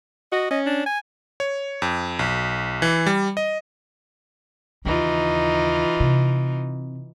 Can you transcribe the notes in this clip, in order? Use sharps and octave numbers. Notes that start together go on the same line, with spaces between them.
F#4 D#5
C#4 D#5
D4
G#5
C#5
F2
B1
E3
G3
D#5
D#2 C#3 E3 D#4 F4
C3